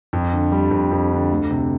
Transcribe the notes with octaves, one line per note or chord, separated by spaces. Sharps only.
F2
D3
G3
F2
F2
D3
D2
C3